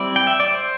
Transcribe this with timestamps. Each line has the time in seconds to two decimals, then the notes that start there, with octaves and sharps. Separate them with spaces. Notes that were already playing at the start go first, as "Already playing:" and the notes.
Already playing: G3 C4 E4 D5
0.16 G5
0.27 E5
0.40 D5
0.51 C5